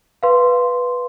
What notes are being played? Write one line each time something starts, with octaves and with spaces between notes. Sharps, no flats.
B4 F5 C6